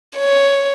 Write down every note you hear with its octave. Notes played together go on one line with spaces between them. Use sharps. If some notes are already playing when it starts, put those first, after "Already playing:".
C#5